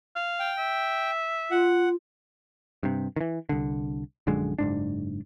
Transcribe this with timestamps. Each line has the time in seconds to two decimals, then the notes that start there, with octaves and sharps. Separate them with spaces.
0.16 F5
0.40 G5
0.59 E5
1.51 F4 F#5
2.83 G2 C3
3.16 D#3 E3
3.49 C2 D3
4.27 A#1 F#2 D3 G#3
4.59 F#1 G#2 D4